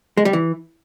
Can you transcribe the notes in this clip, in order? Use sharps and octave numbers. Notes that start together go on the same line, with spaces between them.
G#3
G3
E3